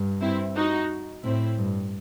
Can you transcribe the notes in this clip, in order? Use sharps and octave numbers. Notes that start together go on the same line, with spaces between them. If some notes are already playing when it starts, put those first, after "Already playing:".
Already playing: G2
C4 E4
D#4 F#4
A2 C4 E4
G2